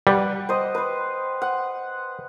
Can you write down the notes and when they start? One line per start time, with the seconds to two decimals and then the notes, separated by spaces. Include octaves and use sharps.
0.07 G3 B4 F#5 G5
0.49 C5 D#5
0.75 B4 C5
1.42 F#5